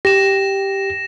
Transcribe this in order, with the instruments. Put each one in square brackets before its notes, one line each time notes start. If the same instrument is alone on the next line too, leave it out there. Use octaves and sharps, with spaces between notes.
[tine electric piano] G4 [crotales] A#6 E7